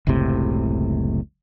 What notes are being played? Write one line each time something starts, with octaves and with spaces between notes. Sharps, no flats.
F#1 C#2 A2 C3